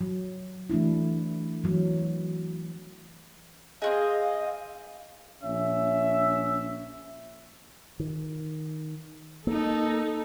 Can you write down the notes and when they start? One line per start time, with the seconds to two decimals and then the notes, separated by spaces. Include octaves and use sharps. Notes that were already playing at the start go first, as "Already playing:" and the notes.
0.01 F#3
0.70 E3 A3 D4 E4
1.64 E3 F#3
3.82 C4 F#4 G#4 D#5 F5
5.43 A#1 C#4 E5
8.00 D#3
9.47 A#3 D#4 A4